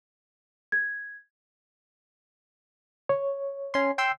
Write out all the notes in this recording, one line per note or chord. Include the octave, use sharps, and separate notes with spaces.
G#6
C#5
C#4 C6
G5 C6 E6